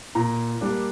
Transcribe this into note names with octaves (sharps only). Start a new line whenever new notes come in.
A#2 A#5
G3 A#3 D4